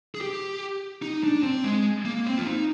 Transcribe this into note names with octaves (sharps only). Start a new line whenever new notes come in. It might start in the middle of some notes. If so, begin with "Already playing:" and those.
G#4
G4
D#4
D4
C4
G#3
A#3
C4
F4
D#4